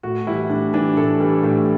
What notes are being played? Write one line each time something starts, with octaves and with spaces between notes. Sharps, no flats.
A2 F#4
E3 G3 E4
A2 D4
E3 G3 D4
A2 A4
E3 G3
A2